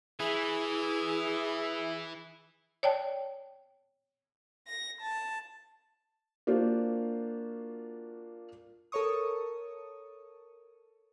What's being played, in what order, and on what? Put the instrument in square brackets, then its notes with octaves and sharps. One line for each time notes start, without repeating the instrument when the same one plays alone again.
[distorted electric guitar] E3 [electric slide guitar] E4 [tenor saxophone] G#4
[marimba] C#5 D5 G5 A5
[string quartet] A#6
A5
[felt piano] A#3 D4 F4 F#4 C5
[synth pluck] A4 A#4 C#5 C#6 D#6